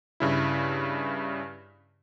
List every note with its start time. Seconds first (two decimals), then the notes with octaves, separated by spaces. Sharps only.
0.20 G2 C#3 E4